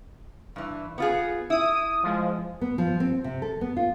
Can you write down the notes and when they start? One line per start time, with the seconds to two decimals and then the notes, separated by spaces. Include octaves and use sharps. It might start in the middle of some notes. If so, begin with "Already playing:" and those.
0.56 G2 E3
0.98 B3 F4 G#4
1.50 E4 D#6
2.03 F3 G#3
2.61 B3
2.78 F3
3.00 C4
3.24 C3
3.42 A4
3.61 B3
3.77 F4